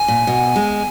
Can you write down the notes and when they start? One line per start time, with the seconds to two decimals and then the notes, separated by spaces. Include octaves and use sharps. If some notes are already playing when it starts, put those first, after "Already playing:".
Already playing: G#5
0.08 A#2
0.27 B2
0.56 G#3